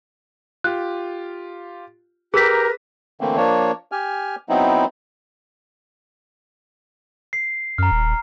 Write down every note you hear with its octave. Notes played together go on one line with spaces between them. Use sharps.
F4 G4 F#6
G4 G#4 A#4 B4 A#5 E6 A#6 B6
D3 E3 A3 A#3 C4
F3 A#3 D4 C#5
G4 G#5 F6
F#3 B3 C4 D#4 E4
C7
F#2 A#5 F6
D#1